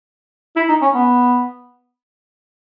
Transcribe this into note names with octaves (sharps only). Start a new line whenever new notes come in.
E4
D#4
C#4
B3